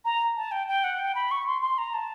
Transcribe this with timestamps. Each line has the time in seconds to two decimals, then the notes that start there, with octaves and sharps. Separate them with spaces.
0.05 A#5
0.37 A5
0.52 G5
0.67 G5
0.84 F#5
0.99 G5
1.15 B5
1.31 C#6
1.47 C6
1.62 C6
1.78 A#5
1.94 A5